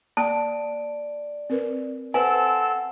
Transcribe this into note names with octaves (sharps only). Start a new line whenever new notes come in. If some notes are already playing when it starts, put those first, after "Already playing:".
A#3 D5 G5 A5
C4 A#4 B4
C4 A4 B4 C5 F#5 G#5 E6